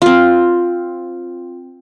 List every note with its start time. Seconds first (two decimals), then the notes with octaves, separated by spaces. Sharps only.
0.02 C4 F4